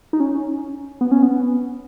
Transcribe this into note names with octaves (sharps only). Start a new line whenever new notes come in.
D#4
C#4
B3
C#4
B3